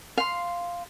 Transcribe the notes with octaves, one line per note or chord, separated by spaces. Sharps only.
F5 C6